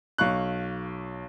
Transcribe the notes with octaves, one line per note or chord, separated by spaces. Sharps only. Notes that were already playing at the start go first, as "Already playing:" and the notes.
B1 F5 C#6 F#6